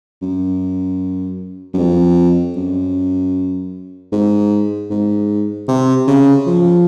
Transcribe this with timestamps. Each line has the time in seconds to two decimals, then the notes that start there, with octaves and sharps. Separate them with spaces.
0.22 F#2
1.74 F#2
1.78 F2
2.56 F#2
4.12 G#2
4.91 G#2
5.68 C3
6.08 C#3
6.47 F3